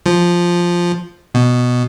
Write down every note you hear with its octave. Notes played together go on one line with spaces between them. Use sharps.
F3
B2